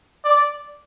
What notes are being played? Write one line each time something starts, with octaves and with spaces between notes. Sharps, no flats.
D5